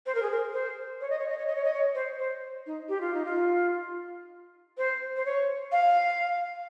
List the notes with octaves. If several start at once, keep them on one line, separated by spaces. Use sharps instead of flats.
C5
A#4
G#4
A#4
C5
C#5
D#5
C#5
D#5
C#5
D#5
C#5
D#5
C#5
C5
C5
D#4
G4
F4
D#4
F4
C5
C5
C#5
F5